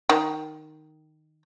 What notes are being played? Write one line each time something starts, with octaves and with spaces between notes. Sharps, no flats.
D#3